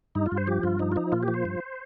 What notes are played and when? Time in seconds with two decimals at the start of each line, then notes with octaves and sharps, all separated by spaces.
0.15 G2 D#4
0.26 F4
0.32 G2
0.37 C5
0.47 F3 G4
0.63 G2 F4
0.79 F3 D#4
0.92 F4
0.96 F3 D#4
1.12 A#2 F4
1.23 G4
1.28 F3
1.34 C5
1.45 G2